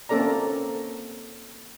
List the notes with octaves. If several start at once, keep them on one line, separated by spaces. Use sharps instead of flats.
A#3 C4 C#4 A4 D5 A#5